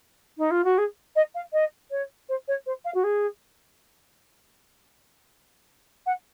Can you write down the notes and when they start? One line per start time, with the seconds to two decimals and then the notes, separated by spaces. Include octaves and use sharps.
0.38 D#4
0.51 F4
0.64 F#4
0.78 G#4
1.16 D#5
1.35 F5
1.53 D#5
1.91 C#5
2.29 C5
2.48 C#5
2.66 C5
2.85 F5
2.94 F#4
3.04 G#4
6.06 F#5